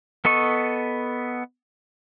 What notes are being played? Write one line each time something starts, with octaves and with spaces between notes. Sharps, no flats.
B3 A4 D#5 C#6